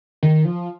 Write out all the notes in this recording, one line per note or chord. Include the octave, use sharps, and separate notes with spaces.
D#3
F3